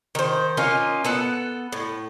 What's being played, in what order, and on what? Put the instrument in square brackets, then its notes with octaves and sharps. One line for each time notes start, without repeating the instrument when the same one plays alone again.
[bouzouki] D#3 C5
A#3 C#4 D#4 F4
B3 A4 F#5
A2